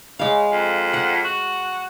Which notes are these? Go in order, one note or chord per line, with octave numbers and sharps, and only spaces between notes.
C#3 G#3 F5
F2
F#5
F#4